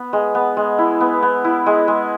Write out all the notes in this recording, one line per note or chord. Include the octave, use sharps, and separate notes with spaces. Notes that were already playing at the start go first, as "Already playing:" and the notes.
Already playing: B3
G#3
B3
G#3
E4
B3
B3
E4
G#3
G#3